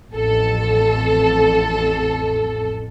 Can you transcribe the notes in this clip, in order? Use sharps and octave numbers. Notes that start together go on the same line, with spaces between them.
A1 F2 A4